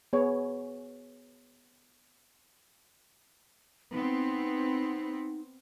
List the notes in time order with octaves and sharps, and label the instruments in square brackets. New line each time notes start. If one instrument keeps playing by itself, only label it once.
[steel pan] B3 G#4 C#5
[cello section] B3 C4 [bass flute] D#4